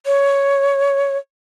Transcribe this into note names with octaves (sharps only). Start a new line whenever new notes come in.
C#5